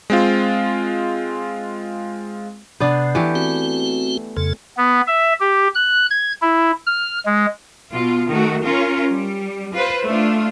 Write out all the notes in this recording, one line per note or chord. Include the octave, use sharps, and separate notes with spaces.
G#3 C4 F4
C3 B3 D4
E3 A3 G4
C4 F#4
F2 C#3 A4
B3
E5
G4
F#6
G#6
E4
F6
G#3
B2 F4
D#3 A3 F#4
C#4 F4 A#4
G3
F4 B4 C5
A3 D4 F4